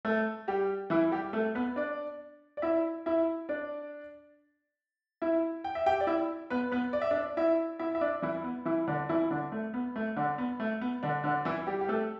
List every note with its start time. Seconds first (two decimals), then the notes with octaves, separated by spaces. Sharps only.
0.05 A3 A4
0.48 G3 G4
0.90 E3 E4
1.12 G3 G4
1.33 A3 A4
1.55 B3 B4
1.76 D4 D5
2.57 D5
2.62 E4 E5
3.06 E4 E5
3.49 D4 D5
5.22 E4 E5
5.64 G5
5.75 E5
5.86 G4 G5
6.01 D5
6.07 E4 E5
6.50 B3 B4
6.72 B3 B4
6.93 D5
7.02 E5
7.11 D4 D5
7.37 E4 E5
7.79 E4 E5
7.95 E5
8.01 D4 D5
8.22 E3 E4
8.44 B3
8.65 E3 E4
8.88 D3 D4
9.09 E3 E4
9.30 D3 D4
9.52 A3
9.74 B3
9.96 A3
10.16 D3 D4
10.38 B3
10.60 A3
10.81 B3
11.03 D3 D4
11.24 D3 D4
11.45 E3 E4
11.67 G3 G4
11.81 G4
11.88 A3 A4